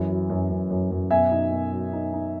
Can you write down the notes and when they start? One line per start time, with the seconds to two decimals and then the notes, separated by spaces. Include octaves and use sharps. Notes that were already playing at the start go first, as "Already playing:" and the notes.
Already playing: F#2 E3
0.09 F#3
0.30 F#2
0.50 F#2
0.70 F#2
0.91 F#2
1.11 B2 E5 G#5
1.32 D#4
1.52 B2
1.72 F#3
1.93 D#4
2.14 D#4